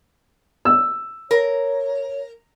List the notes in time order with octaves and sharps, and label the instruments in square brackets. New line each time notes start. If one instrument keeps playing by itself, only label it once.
[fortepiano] E6
[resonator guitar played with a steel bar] A#4 [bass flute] C#5